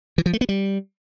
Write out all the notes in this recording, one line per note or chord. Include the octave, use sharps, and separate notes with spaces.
E3
F3
A3
B3
G3